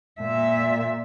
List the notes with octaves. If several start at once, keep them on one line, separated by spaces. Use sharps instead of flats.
A#2 E5